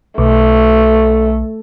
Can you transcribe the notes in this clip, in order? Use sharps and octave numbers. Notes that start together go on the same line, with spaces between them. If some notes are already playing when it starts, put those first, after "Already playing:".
B1 A3